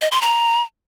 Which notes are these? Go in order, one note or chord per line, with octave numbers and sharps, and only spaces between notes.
D#5
C6
A#5